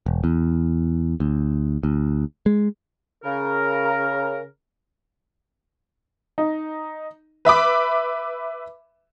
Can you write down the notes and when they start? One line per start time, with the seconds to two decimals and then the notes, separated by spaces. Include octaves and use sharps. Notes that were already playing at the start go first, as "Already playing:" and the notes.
0.06 E1
0.24 E2
1.20 D2
1.83 D2
2.46 G#3
3.24 C#3 A#4
6.38 D#4
7.45 B4 E5 B5 D6